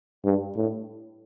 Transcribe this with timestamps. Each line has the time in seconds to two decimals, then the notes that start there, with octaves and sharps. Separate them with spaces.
0.25 G2
0.57 A2